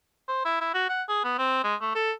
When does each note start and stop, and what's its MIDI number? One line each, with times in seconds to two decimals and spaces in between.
0.28 0.43 72
0.45 0.59 64
0.61 0.70 64
0.74 0.86 66
0.89 1.03 78
1.09 1.22 68
1.24 1.37 59
1.38 1.62 60
1.64 1.75 56
1.81 1.93 57
1.95 2.12 69